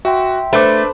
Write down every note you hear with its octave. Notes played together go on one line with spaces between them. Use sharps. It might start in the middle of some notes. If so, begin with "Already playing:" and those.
F#4 E5 G5 C6
A3 D4 B4 C5 B5 D6